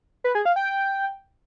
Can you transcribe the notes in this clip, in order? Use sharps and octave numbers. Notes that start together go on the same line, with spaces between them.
B4
G#4
F5
G5
G5